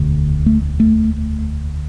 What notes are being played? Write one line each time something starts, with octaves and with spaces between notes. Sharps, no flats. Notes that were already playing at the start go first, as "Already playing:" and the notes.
Already playing: E1 D2 D3
A3
A3